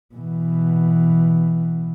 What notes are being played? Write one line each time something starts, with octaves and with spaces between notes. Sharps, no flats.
B2 E3